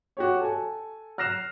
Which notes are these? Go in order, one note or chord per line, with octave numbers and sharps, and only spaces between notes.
F#4 G4 C#5
A4 G#5
F6 F#6 A#6 C7 E7 F7